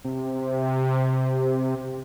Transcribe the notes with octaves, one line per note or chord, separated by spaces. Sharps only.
C3